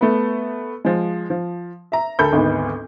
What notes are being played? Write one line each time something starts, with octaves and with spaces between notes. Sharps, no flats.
A3 B3
F3 G#3
F3
E5 A#5
D2 A4 A#4 B5 G6
G#1 D2 G#2 B3